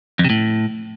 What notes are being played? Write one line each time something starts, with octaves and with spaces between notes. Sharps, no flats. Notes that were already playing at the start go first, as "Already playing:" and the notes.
F2
C3
A2